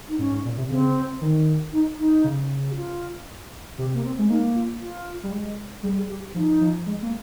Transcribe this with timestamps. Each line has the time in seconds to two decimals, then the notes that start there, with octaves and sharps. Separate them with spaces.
0.08 D#4
0.18 G#2 C#4
0.32 G#2
0.45 A#2
0.57 C3
0.70 C#3 C4
1.21 D#3
1.72 D#4
1.98 D#4
2.24 C#3
2.71 G4
2.75 F4
3.78 C3 G4
3.94 A#3
4.04 C4
4.18 G#3
4.29 A#3 D#4
4.55 F4
4.81 F4
5.23 G3
5.31 G#3
5.83 G3 G#4
5.96 G#4
6.09 G4
6.34 F3 D#4
6.61 F3
6.86 G#3
7.03 A#3